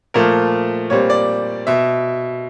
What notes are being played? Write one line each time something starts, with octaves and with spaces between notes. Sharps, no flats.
A#2 F3 A3 A#4
A#2 G3 C4 C#5
D5
B2 E5